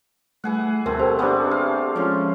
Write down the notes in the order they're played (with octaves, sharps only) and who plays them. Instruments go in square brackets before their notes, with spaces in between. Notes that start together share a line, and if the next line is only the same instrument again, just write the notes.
[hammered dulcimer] E3 G#4 F#5 [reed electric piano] G3 A3
[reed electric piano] D2 [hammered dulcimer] B2 A3 [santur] C4 [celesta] A#4
[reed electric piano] G4 A4 G5 [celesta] C5
[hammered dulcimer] G#3 A3 [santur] B3 C4 D4
[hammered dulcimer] F5
[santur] F3 C#4 [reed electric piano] G#3